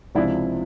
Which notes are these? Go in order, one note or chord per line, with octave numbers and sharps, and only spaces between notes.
C#2 C3 F3 G#3 D4 E4